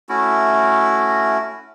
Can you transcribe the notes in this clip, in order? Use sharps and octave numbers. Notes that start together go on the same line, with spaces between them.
A3 C#4 E4 F#4